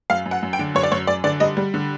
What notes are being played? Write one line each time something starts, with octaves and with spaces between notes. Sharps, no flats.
F#2 F5
F#2
F#5
F#2
G5
D3
F#2 C#5
D5
F#2 C#5
F#2 D5
D3 D5
G3 D#5
G3
D3